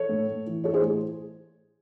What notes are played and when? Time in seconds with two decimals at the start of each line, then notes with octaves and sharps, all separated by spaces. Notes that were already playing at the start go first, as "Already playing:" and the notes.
Already playing: A4 C#5
0.09 A2
0.27 A2
0.47 E3
0.64 E3 A4 C#5
0.74 G#4 C5
0.82 A2